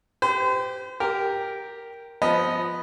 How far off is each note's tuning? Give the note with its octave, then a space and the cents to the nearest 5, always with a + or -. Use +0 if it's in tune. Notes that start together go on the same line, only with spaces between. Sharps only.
G4 +0 C5 -40
G4 +0 A#4 +0
F3 +0 B3 +0 D#5 +0